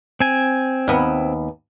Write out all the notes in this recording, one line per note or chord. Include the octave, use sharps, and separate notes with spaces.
C4 G#5
D#2 B3